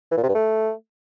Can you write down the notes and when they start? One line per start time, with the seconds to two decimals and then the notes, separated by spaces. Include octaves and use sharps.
0.11 E3
0.17 A#2
0.23 C3
0.29 G2
0.35 A3